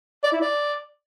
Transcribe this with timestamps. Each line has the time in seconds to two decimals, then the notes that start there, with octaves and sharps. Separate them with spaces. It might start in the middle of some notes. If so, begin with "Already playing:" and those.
0.24 D5
0.32 E4
0.41 D5